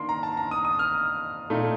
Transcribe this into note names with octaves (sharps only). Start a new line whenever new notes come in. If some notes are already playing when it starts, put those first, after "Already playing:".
Already playing: D#3 A#3 D4 C6
A#5
A5
A#5
D#6
D#6
F6
A#2 A3 D#4